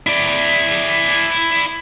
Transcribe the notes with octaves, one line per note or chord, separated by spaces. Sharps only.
E4 D5